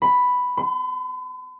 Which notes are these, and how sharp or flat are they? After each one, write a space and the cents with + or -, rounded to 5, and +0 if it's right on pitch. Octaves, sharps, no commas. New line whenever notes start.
B5 +5
B5 +45